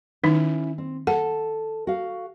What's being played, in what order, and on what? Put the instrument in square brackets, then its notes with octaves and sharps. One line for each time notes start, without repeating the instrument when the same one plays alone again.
[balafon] D#3 D#4 [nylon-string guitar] C#4 E4
[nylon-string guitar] C4
[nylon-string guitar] A4 [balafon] F#5
[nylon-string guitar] F#4 F5